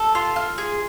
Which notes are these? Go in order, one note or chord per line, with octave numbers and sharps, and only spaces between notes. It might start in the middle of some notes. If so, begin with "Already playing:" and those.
Already playing: A4
F4
F4
G#4